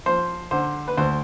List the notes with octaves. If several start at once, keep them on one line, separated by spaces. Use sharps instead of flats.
F3 C5
D3 C5
B4
D2 C5